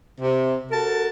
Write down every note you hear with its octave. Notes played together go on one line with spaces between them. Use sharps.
C3
F#4 A4 A#4 A5